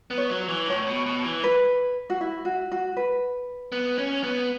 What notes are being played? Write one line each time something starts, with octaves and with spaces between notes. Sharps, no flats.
B3
C#5
F#3
C#5
E3
A2 C#5
B2
B2
E3
B4
F#4
E4
F#4
F#4
B4
B3
C#4
B3